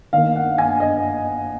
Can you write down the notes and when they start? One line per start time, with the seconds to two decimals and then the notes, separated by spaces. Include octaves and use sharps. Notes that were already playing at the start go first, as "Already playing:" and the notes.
0.13 D#3 A#3 F5
0.36 F#5
0.58 G#5
0.80 D#5